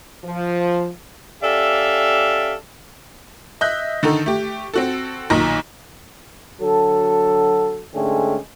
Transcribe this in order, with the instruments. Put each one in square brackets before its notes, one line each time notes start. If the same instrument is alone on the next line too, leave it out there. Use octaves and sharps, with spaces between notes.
[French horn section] F3
[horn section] C#4 G4 A4 D5 E5 F5
[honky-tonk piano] D#5 E5 F#6 G6
D3 D#3 D#4 A4
A3 G4
C4 F#4 A4
B1 A#2 D#3 D#4 A#5 A#6
[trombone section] D3 F#3 F#4 A4
G#2 D3 G#3 A3 C#4 G4